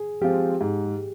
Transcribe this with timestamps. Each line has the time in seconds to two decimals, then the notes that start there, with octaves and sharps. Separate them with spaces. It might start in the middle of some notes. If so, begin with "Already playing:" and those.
Already playing: G#4
0.21 F3 G#3 C4 F4 G4
0.61 G#2